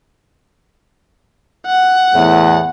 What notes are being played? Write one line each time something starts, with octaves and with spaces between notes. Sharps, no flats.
F#5
E2 A2